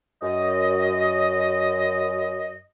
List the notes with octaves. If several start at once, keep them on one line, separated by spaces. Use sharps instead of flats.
F#2 D#5